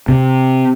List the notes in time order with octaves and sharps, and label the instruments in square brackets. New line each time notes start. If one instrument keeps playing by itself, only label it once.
[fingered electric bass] C3